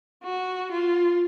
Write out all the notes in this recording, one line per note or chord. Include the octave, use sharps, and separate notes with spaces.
F#4
F4